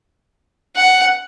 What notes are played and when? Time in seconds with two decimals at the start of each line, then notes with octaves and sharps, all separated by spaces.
0.76 F#5